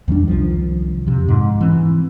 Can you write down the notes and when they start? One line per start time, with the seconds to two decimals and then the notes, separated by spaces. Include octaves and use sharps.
0.08 E2 D#3 G3 D4
0.28 C2 D#3 F3
1.07 F2 C3
1.28 G#2
1.61 E3 C4